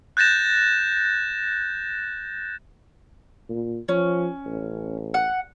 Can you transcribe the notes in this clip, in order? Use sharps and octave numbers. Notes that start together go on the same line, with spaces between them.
F#6 G6 A6 A#6 E7
A#2
F3 C#4
A1
F#5